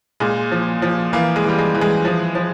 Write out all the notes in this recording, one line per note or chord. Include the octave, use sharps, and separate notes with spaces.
A#2 G#3
F3
F3
E3 A#3
G#3
E3 G3
G#3
E3
G#3
F3
F3